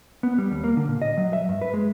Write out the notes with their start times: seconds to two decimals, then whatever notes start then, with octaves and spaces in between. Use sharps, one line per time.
0.23 B3
0.38 G3
0.52 D#2
0.64 A#3
0.77 D3
0.88 A#2
1.02 D#5
1.17 F#3
1.33 E5
1.49 G2
1.62 B4
1.74 G#3